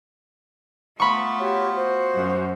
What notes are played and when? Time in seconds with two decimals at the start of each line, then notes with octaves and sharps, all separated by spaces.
1.00 A3 B3 F4 B5 C#6
1.39 F#4 G4 C#5
1.75 F#4 C5
2.15 F#2